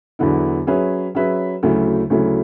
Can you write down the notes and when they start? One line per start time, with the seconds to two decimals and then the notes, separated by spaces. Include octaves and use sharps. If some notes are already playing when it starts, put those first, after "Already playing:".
0.19 E2 D3 F#3 B3 E4
0.67 F#3 C#4 G#4 B4 E5
1.15 F#3 C#4 G#4 B4 E5
1.63 D2 C#3 F#3 A3 E4
2.10 D2 C#3 F#3 A3 E4